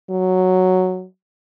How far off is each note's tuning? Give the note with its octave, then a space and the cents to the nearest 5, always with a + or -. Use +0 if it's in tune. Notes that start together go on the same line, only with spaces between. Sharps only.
F#3 +0